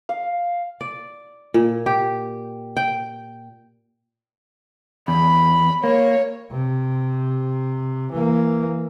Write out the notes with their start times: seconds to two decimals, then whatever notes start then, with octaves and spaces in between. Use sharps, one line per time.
0.09 F5
0.81 D5
1.54 A#2
1.86 G4
2.77 G5
5.08 E2 B5
5.84 A#3 C#5
6.51 C3
8.12 E3 A#3